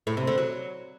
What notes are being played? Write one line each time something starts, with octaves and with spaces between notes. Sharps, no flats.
A2
C3
D3
F#3